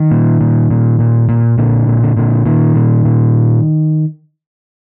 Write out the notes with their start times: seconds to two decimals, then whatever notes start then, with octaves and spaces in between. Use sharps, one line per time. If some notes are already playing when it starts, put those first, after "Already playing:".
Already playing: D#3
0.11 A#2
0.41 A#2
0.71 A#2
0.99 A#2
1.29 A#2
1.58 A#2 D3
1.87 A#2
2.03 D3
2.17 A#2 D3
2.46 A#2 D#3
2.76 A#2
3.05 A#2